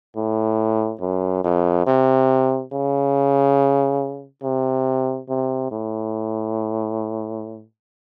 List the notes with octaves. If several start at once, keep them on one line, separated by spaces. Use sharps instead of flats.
A2
F#2
F2
C3
C#3
C3
C3
A2